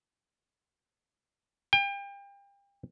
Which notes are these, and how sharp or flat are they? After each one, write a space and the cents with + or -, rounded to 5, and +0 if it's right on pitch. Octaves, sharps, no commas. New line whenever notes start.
G5 +35